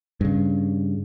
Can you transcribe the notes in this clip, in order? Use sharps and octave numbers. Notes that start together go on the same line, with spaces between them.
G2 C#3